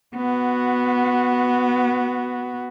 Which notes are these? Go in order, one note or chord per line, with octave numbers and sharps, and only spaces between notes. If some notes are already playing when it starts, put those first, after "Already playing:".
B3 F#4